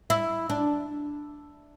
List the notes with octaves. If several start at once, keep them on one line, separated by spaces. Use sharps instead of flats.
E4
D4